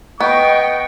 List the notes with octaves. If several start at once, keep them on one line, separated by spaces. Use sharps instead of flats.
B3 D#5 G5 C#6